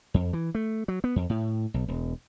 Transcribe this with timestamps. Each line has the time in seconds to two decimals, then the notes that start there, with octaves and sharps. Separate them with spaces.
0.14 F2
0.33 E3
0.55 A3
0.88 F#3
1.04 B3
1.16 F2
1.30 A2
1.74 B1
1.88 E1